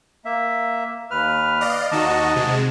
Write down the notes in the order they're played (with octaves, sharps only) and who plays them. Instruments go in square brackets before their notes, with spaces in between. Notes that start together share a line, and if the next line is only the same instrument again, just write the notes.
[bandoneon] A#3 E5
D#2 B4 F6
[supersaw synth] D5 D#5 F5
[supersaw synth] D#2 D#4 F#4 [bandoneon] D#5 A5
[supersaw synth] C3 G#3